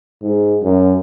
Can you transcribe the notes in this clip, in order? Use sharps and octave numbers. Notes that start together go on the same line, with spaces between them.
G#2
F#2